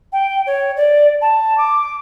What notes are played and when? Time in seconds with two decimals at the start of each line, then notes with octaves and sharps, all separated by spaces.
0.13 G5
0.47 C#5
0.77 D5
1.22 A5
1.58 D6